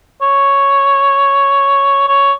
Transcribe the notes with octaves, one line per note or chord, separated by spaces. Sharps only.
C#5
C#5